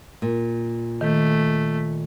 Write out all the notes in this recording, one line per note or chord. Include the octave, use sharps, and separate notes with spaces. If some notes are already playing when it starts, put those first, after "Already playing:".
A#2
D#3 A3